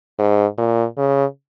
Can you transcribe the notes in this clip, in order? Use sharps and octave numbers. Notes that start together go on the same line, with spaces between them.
G#2
A#2
C#3